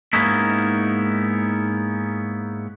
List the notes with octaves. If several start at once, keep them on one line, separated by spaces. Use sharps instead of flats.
G#2 A#3 B3 C#4 D#4 E4